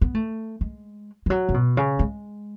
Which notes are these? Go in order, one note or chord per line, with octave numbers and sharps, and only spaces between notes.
B3
A3
G#3
E3
F#3
C#3
B2
C#3
G#3